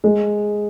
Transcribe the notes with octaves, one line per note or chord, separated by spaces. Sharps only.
G#3